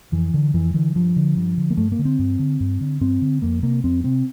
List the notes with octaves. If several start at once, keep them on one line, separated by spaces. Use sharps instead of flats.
F2 E3
D3
F2 E3
D3 E3
G2 F3
D3
G2
D3
A#3
G2 A3
A#3
D3
C4
G2
D3
G2
D3
G2 C4
D3
F2 A#3
C3 A#3
F2 C4
C3 C4